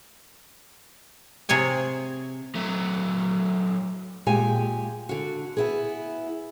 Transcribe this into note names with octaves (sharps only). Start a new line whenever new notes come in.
C3 G#4 C#5 G#5
F#3 A3
A#2 G#3 G4 G#5
D3 F#4
B3 E4 G#4